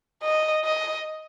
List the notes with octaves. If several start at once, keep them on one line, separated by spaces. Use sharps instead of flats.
D#5
D#5